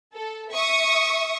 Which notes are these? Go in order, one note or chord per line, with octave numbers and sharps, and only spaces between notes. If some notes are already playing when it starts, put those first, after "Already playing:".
A4
E5 C#6 D#6